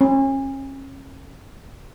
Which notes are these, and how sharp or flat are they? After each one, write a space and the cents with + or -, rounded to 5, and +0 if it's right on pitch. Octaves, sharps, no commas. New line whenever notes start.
C#4 -35